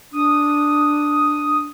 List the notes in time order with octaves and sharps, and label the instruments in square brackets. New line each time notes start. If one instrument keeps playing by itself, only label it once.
[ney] D4 [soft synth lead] D#6